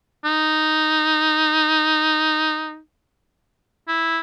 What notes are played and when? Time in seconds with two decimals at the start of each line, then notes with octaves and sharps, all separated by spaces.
0.25 D#4
3.88 E4